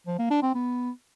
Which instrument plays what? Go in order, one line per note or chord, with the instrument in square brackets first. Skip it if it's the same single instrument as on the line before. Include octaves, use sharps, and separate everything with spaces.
[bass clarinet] F3
A#3
D4
C4
B3